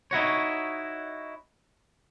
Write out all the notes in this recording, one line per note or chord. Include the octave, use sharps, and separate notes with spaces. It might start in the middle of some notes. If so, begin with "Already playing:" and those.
D#4 E4 F#4 C#5